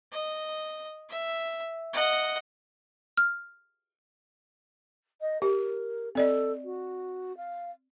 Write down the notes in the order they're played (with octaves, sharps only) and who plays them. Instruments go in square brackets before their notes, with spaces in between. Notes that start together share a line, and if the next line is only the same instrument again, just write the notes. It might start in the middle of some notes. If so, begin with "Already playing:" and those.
[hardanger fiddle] D#5
E5
D#5 F#5
[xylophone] F6
[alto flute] D#5
[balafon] G4 [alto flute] A#4
[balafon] C4 D5 D#5 [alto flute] A4
[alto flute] F#4
F5